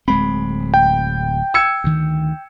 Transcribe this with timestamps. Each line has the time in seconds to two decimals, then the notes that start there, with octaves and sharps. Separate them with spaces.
0.08 D1 G#3 C4 B5
0.74 G5
1.54 E6 G#6 C#7
1.84 D2 D#3